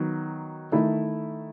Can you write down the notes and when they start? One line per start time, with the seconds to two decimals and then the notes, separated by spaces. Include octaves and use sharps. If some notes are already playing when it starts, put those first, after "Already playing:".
Already playing: D#3 F#3 B3
0.72 D#3 A3 E4